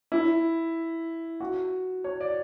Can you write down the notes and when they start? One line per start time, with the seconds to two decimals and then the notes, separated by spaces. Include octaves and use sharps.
0.12 E4
1.40 F#4
2.04 C#5
2.20 D5